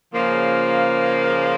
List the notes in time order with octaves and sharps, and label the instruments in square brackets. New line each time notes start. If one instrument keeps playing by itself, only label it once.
[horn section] C#3 F3 A#3